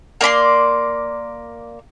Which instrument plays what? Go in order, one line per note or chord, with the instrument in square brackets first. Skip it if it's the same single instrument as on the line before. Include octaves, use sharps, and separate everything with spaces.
[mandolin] A#3 D5 B5 C6